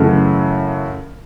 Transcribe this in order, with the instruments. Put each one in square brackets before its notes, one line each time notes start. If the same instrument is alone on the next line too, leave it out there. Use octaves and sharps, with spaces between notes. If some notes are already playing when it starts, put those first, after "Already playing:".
Already playing: [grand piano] F#2 C#3 E3 A3